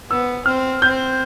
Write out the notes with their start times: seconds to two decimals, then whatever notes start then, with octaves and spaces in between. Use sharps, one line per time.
0.10 B3 E6
0.46 C4 F6
0.82 C4 G6